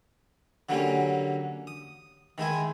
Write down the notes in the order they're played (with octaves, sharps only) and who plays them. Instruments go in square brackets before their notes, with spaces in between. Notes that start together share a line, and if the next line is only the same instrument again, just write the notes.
[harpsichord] D3 F#3 G3 A#3 C#4
D#6
D#3 G#3 E4 G#5